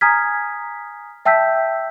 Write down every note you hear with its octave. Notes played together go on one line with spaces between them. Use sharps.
G#5 A#5 D#6 F6 G#6 B6
E5 G5 A5 E6 G6 B6